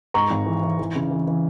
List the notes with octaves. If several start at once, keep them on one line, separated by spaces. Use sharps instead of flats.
G#2 A#5 C#6
G#1
E3
E3
E3
C#3
E3
E3